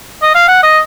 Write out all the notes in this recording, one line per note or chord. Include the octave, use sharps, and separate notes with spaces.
D#5
F5
F#5
D#5